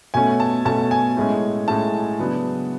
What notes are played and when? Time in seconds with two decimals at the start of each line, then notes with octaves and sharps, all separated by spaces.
0.14 B2 A3 C#4 G#5
0.40 A5
0.65 B2 A3 C#4 A5
0.91 G#5
1.17 A2 G#3 C#4
1.68 A2 G#3 C#4 A5
2.19 C#3 F#3 B3 D4